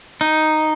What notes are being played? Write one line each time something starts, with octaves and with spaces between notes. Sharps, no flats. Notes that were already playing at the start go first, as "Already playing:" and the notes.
D#4